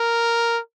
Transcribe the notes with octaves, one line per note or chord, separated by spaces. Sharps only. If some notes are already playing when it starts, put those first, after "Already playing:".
Already playing: A#4